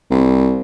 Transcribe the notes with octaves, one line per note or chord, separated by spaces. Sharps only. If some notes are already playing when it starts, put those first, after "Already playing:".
C2